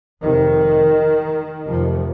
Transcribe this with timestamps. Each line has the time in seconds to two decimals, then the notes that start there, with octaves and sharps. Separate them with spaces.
0.22 F1 F2 C3 D#3
1.67 F1 F2 C3 F3